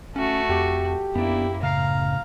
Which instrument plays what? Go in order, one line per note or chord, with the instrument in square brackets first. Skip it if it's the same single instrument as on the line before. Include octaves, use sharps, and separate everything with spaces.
[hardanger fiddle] A3 F#4 [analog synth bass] C#4
[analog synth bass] F2 [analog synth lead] G4
[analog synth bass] F#2 [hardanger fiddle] A#3 E4 [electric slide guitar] B3 D4
[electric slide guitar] A2 C#3 [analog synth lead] F5 [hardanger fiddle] A#5